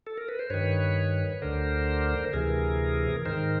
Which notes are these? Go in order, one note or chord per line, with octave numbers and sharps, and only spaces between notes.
A4
A#4
B4
C5
G2 D#3 B4 C#5
D2 D3 A#4 C5
D2 C3 E3 G#4 A#4
G#2 D#3 A#4 C5